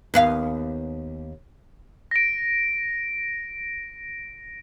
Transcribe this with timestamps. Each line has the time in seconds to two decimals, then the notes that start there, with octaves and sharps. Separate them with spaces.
0.14 D#2 B3 F5
2.11 A#6 D7